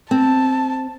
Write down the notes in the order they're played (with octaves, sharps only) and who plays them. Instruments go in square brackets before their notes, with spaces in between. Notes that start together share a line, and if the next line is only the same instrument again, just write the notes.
[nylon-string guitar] C4 [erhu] A5